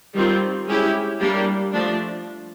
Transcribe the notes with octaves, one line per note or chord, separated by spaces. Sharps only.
D#3 G3 C4 F4
G#3 C#4 E4 G4
G3 A#3 D4 G4
F3 A3 D4